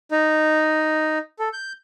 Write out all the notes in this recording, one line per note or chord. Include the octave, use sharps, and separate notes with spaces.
D#4
A4
G6